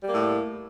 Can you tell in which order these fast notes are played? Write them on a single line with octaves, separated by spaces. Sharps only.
G3 A#3 A2